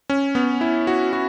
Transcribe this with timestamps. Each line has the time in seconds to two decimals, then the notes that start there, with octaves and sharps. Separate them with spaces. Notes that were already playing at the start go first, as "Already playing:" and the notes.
0.10 C#4
0.35 B3
0.61 E4
0.87 F#4
1.13 F#4